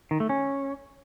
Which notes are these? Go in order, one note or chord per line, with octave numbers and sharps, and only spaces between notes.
D#3
A3
C#4